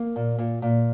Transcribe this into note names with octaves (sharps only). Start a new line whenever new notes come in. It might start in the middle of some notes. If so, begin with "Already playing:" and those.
Already playing: A#3
A#2
A#2
A#2